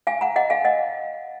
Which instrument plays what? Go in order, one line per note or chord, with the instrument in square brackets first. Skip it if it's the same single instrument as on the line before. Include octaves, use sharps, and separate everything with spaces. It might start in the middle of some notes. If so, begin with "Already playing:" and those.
[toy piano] F5 G#5
F#5 A#5
D#5 F#5
F5 G#5
D#5 F#5